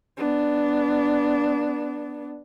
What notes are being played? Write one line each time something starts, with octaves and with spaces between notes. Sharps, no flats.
B3 D4